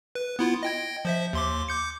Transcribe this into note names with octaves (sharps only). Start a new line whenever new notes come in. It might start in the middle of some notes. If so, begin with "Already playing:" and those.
B4
B3 E4 F4
D#5 G5 G#6
F3 C5 E5
D#2 C6 D6
D6 G6 C#7